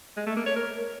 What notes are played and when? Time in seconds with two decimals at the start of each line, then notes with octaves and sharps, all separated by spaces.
0.17 G#3
0.27 A3
0.36 A#3
0.46 C#5
0.56 A#4